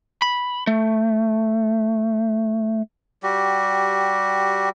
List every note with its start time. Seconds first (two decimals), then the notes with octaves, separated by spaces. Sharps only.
0.22 B5
0.67 A3
3.23 G3 F#4 G4